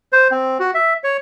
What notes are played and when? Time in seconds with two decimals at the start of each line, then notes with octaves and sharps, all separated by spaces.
0.12 C5
0.31 C4
0.60 F#4
0.74 E5
1.04 C#5